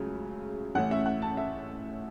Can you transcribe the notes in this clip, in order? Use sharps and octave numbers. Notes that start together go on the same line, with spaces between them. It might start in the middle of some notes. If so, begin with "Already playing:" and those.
Already playing: C#2 C#3 F#3 A3 C#4
A1 A2 A3 C#4 F#5
E5
F#5
A5
E5